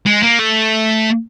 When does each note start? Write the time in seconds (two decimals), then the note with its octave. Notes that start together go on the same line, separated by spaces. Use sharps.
0.07 G#3
0.23 A#3
0.39 A3